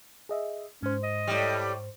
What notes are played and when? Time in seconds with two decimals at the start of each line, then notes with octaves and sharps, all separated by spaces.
0.29 G#4 D#5 E5
0.83 G#2 C#4 C5
1.03 D#5
1.27 A2 G3